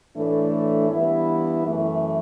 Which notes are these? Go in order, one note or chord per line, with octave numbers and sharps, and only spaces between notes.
A2 E3 A3 D4
G2 E3 B3 E4
F#2 E3 A3